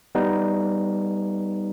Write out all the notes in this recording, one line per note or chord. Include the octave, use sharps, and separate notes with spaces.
G3 B3 D#4